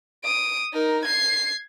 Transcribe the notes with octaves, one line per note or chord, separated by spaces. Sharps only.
D#6 D7
D#4 A#4
G#6 C7